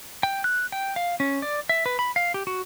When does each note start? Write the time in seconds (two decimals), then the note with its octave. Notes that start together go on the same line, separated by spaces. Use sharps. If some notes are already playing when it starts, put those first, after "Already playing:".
0.23 G5
0.44 F#6
0.72 G5
0.96 F5
1.20 C#4
1.42 D5
1.69 E5
1.86 B4
1.99 B5
2.16 F5
2.34 G4
2.47 F#4